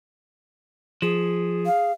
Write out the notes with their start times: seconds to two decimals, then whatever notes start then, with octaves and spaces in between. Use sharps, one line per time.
1.02 F3 G#4
1.66 F5